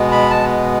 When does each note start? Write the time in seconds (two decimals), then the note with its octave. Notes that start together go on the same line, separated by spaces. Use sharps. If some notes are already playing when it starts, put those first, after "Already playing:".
Already playing: B2 G#3 B3
0.12 B5
0.30 A5